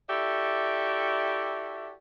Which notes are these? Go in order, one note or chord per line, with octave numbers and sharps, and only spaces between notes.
E4 F#4 G4 A4 D5 E5